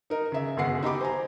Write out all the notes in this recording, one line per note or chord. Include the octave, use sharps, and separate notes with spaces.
D#4 A#4
C#3 E5
G1 F#2 C#3 F#5 C7
D#4 G4 B5 D6
C5 G#5 A#5